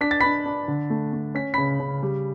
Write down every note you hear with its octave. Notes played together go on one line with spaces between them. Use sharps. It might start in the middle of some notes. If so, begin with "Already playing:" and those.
D4 B6
A6
D4 B5 B6
D4
D3
A3
A3
C#4 B6
C#3 B5 B6
C#3
G3